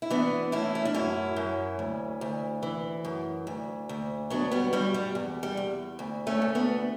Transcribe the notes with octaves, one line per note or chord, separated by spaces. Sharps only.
E4
E3 B3 D4
A2 C#4 E4
C#4
D4
F#2 C#4 E4
F#2
D2
D2
E3
F#2
D2
D2
F#3 B3 D4
G3 B3
G2 G3
G3
E2
G3
E2
D2
A3 C#4
D2
B3 D4